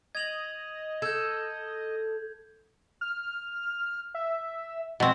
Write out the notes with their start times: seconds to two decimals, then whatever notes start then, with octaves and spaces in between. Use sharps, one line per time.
0.15 D#5 G#6 F7 F#7
1.02 A4 G6 G#6
3.01 F6
4.15 E5
5.00 B2 C4 F#4